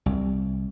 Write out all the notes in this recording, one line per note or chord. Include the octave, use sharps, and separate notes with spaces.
C2